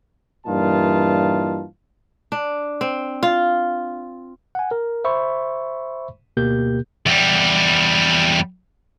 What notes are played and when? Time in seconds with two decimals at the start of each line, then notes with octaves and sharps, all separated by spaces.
0.47 G2 A#2 E3 D#4 F4 A5
2.32 D4
2.81 C4
3.23 F4
4.55 F#5 G#5
4.71 A#4
5.05 C5 E5 B5 C#6
6.37 D2 B2 A#3 G4 A#4 G6
7.06 E2 G3